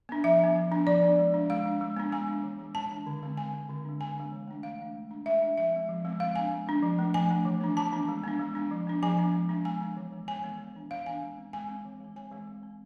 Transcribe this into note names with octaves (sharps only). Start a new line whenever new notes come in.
B3 D4
F3 E5
B3 D4
F3
B3 D4
F3 D5
B3 D4
G#3
D4
G#3 F5
D4
G#3
B3 D4
G#3 G#5
B3 D4
E3
G#3 D4
E3 A5
G#3 D4
D3
G#3 C4
D3 G#5
G#3 C4
D3
G#3 B3 D4
D3 G#5
G#3 B3 D4
E3
A3 D4
E3 F5
A3 D4
G#3
D4
G#3 E5
D4
F3 E5
G#3 C4
F3
G#3 C4
G#3 F5
B3 D4 G#5
G#3
B3 D4
F3
A3 D4
F3 G#5
A3 D4
E3
B3 D4
E3 A5
B3 D4
G#3
B3 D4
G#3
B3 D4
F3
B3 D4
F3 G#5
B3 D4
G#3
B3 D4
G#3 G#5
B3 D4
E3
G#3 B3
E3 G#5
G#3 B3
E3
B3 D4
E3 F5
B3 D4 G#5
G#3
C4
G#3 G#5
C4
E3
G#3 C4
E3 G#5
G#3 C4
G#3
C4